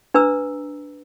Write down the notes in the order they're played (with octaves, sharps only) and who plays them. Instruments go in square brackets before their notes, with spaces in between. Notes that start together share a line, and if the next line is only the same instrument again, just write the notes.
[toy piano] D4 B4 A#5 E6